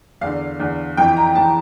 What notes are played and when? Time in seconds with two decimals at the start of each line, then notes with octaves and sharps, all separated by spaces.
0.21 E2 D3 F5
0.60 E2 D3
0.97 F2 E3 G5
1.17 A#5
1.35 F2 E3 A5